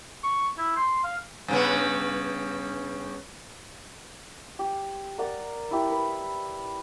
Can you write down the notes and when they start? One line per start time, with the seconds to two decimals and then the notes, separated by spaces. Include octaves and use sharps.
0.23 C#6
0.58 E4
0.76 C6
1.04 F5
1.48 G2 C#3 B3
4.59 G4
5.18 A#4 D5 F#5 A#5
5.71 E4 G4
5.89 B4